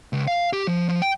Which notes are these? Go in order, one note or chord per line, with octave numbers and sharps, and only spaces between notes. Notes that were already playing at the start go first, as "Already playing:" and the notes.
C#2
F5
G4
F3
F3
G5